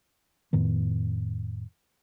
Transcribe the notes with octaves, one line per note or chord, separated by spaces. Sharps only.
F2 A2 D#3 B3